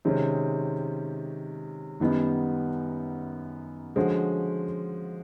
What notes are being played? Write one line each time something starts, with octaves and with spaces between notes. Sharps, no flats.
C3 D#3 G#3 C#4
F#2 D#3 G3 B3 D#4
D3 F3 G#3 C#4 F#4